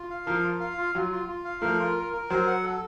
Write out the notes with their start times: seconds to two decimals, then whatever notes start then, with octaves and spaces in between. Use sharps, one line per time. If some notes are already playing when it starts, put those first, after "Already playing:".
Already playing: F4
0.10 F5
0.26 F3 A#4
0.43 F4
0.60 F5
0.77 F4
0.95 F#3 F4
1.12 F4
1.28 F4
1.45 F5
1.62 F3 A3 A#4
1.80 F4
1.96 A#4
2.13 A#4
2.30 F#3 C5
2.47 F#5
2.63 A4